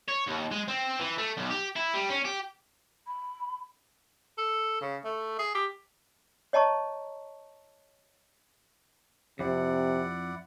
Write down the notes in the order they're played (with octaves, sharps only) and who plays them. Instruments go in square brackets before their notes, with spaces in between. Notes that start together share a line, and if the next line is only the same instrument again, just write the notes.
[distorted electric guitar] C#5
D#2
G#3
C4
E3
A3
B1
G4
E4
G3
C#4
G4
[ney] B5
[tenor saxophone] A4
C#3
A3
G#4
G4
[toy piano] C#5 D#5 A5 A#5 C#6
[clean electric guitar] F2 [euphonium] C3 [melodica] E4 D5 F#5